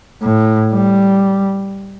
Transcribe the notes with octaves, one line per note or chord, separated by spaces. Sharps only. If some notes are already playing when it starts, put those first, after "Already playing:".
A2
G3